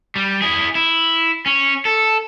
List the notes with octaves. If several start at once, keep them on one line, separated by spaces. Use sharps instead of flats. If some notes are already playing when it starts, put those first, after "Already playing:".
G3
E4 G#4
E4
C#4
A4